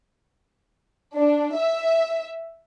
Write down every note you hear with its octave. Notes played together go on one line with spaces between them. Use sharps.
D4
E5